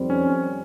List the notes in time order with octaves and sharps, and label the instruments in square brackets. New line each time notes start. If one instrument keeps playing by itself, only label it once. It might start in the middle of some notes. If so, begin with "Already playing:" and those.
Already playing: [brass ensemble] F2 D#3 G3 C4
[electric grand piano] C#4